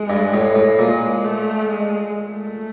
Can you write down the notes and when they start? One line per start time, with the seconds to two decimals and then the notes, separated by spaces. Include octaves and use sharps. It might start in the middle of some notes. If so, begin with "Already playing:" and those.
Already playing: G#3
0.10 G2
0.34 A2
0.55 A2
0.79 A#2 G#3
1.25 A3
1.70 G#3
2.31 A3